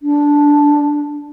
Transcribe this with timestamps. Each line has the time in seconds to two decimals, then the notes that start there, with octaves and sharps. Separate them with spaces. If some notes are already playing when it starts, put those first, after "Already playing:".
0.03 D4